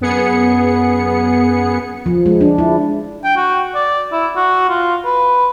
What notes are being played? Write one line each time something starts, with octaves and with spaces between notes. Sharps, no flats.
F#2 B3 G#4 C#7
F3
G#3
D4
E4
G5
F#4
D5
E4
F#4
F4
B4